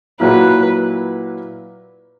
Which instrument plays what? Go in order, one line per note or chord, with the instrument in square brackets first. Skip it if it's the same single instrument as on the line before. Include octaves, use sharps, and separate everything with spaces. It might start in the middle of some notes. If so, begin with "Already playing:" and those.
[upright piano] A#2 F#3 A#3 E4 [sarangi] B4